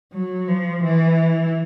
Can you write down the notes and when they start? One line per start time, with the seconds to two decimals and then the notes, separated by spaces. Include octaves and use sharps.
0.13 F#3
0.48 F3
0.84 E3